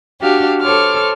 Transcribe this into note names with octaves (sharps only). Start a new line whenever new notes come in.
D4 F#4 G4 F5
A4 C5 C#5 D6 F6